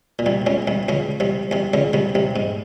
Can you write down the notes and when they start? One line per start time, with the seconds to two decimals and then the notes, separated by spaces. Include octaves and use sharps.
0.19 A#2
0.26 C2 C3
0.46 C#2 C#3
0.67 C2 C3
0.88 C#2 C#3
1.20 C2 C3
1.51 C2 C3
1.74 C#2 C#3
1.93 C2 C3
2.15 C2 C3
2.36 G#2